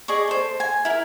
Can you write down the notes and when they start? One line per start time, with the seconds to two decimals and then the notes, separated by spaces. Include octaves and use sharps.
0.08 G#4 D5 D#5 C#6
0.27 A4 C5
0.60 G#5
0.85 E4 A#4